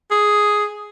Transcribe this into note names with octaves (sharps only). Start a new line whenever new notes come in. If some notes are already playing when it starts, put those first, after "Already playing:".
G#4